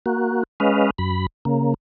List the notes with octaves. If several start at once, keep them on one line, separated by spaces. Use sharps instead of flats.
A#3 F#4
G#3 C#4 B4 D#5 F5
F#2 B5
C#3 A#3